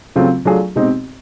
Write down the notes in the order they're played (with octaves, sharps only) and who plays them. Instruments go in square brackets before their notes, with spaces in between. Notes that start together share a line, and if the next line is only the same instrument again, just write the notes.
[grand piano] C#3 F#3 A3 C4 F4
F#3 A3 D4 F4 G#4
B2 G#3 C4 D#4 G4